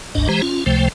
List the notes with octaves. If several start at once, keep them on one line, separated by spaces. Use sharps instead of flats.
F#1 C#2 G2 D4 D#5
E3 G#3 G4 C5 A#5
C#4 F4
C#2 C3 F3 A3 C5 G5